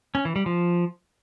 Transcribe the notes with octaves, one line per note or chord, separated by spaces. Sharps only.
C#4
E3
G3
F3